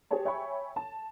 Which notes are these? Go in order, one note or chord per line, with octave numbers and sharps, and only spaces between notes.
G4 G#4 C5 C#5 A5
C#5 E5 G5 G#5 B5 C#6
A5